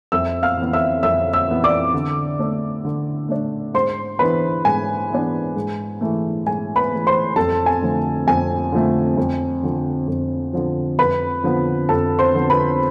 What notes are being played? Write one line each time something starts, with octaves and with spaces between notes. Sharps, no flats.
F2 E5 E6
F5 F6
E3 B3
E5 E6
F2 E5 E6
E5 E6
E3 B3
D5 D6
D3
A3 D4
D3
A3 D4
G#2 C5 C6
E3 B3 D4 B4 B5
G#2 G#5
E3 B3 D4
G#2
E3 A3
G#2 G#5
B4 B5
E3 A3
C5 C6
F2 A4 A5
G#5
D3 F3 A3
F2 G#5
D3 F3 A3
F2
D3 F3
F2
D3 F3
F2 B4 B5
D3 F3 B3
F2 A4 A5
C5 C6
D3 F3 B3
B4 B5